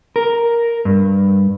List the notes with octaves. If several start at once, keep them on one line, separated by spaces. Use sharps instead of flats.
A#4
G2